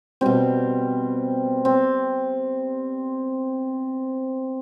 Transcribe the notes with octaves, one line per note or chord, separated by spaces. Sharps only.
B2 G3 C4
C4